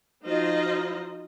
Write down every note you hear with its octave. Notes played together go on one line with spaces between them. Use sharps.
F3 D#4 F4 F#4 C5 D#5